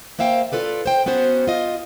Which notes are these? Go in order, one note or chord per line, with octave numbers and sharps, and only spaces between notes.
A#3 C5 E5 F5 G5
F4 A4 B4 D5
C5 G5
B3 C#4 F#4 C5
F4 D#5